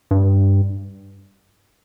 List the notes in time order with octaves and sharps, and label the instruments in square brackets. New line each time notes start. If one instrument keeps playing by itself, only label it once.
[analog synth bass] G2